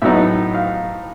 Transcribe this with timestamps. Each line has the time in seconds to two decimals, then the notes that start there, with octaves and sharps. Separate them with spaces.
0.02 A2 F#3 B3 D#4 E5
0.55 F5